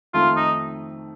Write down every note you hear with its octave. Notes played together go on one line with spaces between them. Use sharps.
F2 D#3 A3 F4
D#4